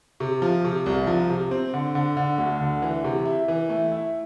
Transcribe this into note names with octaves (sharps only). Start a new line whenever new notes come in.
C3
F3
C3
C2
F3
C3
C4
D3
D3
D3
D2
D3
E3
C3
E4
E3
A3
E4